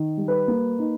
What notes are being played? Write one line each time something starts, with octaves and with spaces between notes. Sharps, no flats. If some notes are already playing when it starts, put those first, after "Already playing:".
Already playing: D#3
G3
B4
A#3
D#4